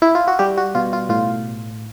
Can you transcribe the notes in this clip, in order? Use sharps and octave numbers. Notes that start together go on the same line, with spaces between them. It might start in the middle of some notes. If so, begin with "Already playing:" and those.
E4
F4
F#4
G3 G4
F#4
B2 F4
F4
A2 F4